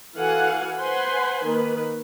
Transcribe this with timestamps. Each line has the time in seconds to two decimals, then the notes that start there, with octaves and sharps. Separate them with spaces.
0.15 E3 F#4 A4 F5 F#5 G#5
0.80 B4 C5 F#5 G#5 B5 C6
1.45 D#3 A#3 B4